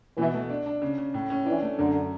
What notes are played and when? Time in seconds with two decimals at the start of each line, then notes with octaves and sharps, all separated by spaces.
0.17 B2 E3
0.34 A3
0.50 D4
0.66 D4
0.81 C#3
0.98 C#3
1.14 A2
1.30 C#4
1.46 E3 D4
1.62 A3
1.78 F#2 D3